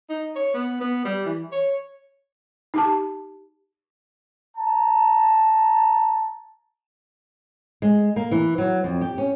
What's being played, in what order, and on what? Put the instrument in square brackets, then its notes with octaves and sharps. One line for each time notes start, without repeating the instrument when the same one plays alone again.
[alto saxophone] D#4
C#5
B3
B3
G3
E3
C#5
[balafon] D#4 G4 A5
[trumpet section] A5 A#5
[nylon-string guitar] G#3
A#3
E3
F#3
F2
G4
C#4